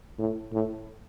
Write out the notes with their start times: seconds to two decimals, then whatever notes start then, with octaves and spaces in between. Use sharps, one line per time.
0.18 A2
0.53 A2